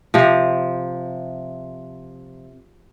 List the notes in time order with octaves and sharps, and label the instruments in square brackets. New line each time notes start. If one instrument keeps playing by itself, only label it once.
[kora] C3 F3